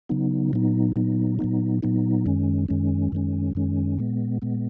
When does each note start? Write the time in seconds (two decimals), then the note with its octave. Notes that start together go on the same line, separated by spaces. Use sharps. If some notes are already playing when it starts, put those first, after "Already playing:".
0.09 C#3 F#3 B3 D#4
0.53 A#2 F#3 B3 D#4
0.96 A#2 F#3 B3 D#4
1.39 A#2 F#3 B3 D#4
1.82 A#2 F#3 B3 D#4
2.26 F#2 D#3 G#3 C#4
2.68 F#2 D#3 G#3 C#4
3.12 F#2 D#3 G#3 C#4
3.55 F#2 D#3 G#3 C#4
3.99 A#2 G#3 B3
4.42 A#2 G#3 B3